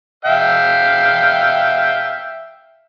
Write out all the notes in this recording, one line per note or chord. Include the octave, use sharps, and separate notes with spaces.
E5 F5 G5